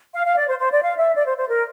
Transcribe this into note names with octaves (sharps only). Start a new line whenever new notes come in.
F5
F5
D5
C5
C5
D5
F5
E5
D5
C5
C5
A#4